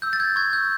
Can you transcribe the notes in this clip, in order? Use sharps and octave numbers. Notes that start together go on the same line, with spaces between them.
E6 G6
A6
G6 G#6
C#6 G#6
E6 G6